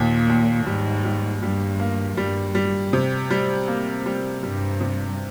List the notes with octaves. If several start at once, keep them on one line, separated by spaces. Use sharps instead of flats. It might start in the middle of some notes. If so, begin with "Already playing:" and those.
Already playing: D#2 A#2
D#2
G#2 G3
G3
G2 G3
A#3
G2 G3
G3
C3
G3
A#3
G3
G2 G3
C3